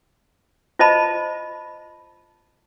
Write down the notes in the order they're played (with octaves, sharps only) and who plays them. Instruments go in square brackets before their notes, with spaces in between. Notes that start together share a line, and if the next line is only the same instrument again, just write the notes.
[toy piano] F4 C5 D#5 A5 B5